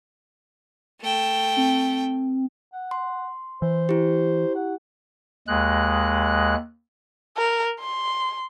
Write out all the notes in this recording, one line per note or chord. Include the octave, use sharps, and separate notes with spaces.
A3 G5
C4
F#5
C6
E3 C5
E4 G4
F#5
D#2 G#3 F#6
A#4
C6